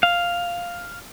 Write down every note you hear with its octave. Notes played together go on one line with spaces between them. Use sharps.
F5